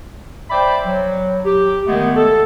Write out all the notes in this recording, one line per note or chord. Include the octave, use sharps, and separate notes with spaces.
C5 D5 E5 G5 B5
F#3
G4
D#3 G#3 A3 B3
A4